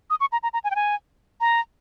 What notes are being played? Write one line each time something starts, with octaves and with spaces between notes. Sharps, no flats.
D#6
C#6
A#5
A#5
A#5
G#5
G5
G#5
A#5